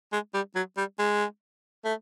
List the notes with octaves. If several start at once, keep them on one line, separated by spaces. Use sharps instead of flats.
G#3
G3
F#3
G3
G#3
A3